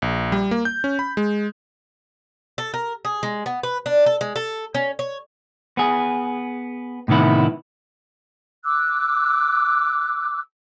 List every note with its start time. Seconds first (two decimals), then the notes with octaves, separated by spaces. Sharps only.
0.02 A#1
0.32 G3
0.51 A#3
0.65 G6
0.84 C#4
0.99 B5
1.17 G#3
2.58 A4
2.74 A#4
3.05 G#4
3.23 G#3
3.46 B3
3.63 B4
3.86 D4
4.06 A4
4.21 G#3
4.36 A4
4.74 C#4
4.99 C#5
5.77 B3 G#4
7.08 A2 C3 D#3 B3 E4
8.65 D6 E6 F#6